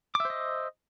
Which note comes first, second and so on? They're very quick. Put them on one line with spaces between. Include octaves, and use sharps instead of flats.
D6 E5 C5 D#5